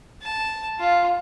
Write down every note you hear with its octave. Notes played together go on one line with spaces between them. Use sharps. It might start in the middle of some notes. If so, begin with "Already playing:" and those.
A5
F4